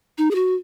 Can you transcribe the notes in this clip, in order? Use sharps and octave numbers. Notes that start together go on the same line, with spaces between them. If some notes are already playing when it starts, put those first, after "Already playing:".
D#4
G#4
F#4